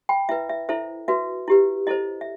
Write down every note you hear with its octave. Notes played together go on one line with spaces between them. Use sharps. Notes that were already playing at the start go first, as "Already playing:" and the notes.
G5 B5
E4 B4 E5
E5
E4 A4 C5 E5
F#4 B4 E5
E4 G4 B4
E4 A4 C5 D#5
E5